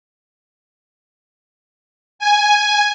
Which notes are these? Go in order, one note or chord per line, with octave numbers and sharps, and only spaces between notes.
G#5